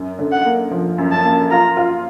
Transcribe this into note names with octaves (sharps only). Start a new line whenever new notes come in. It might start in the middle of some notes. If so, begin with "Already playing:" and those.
Already playing: F#2
D3
F#5
A#3
F3
F#2
A5
A#3
F4 A#5
F4